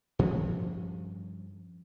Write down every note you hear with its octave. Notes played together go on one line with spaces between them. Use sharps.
G2 F3 F#3 C#4